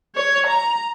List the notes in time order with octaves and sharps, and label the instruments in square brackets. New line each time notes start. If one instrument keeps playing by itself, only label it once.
[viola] C#5
A#5